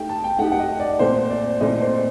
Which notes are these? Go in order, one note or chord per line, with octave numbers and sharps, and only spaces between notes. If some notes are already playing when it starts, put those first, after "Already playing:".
Already playing: A3 D#4 G4 G5
A5
G5
A3 D#4 G4 F#5
F#5
D#5
D5
A#2 A3 C4 C5
D5
A#2 A3 C4 D#5
C5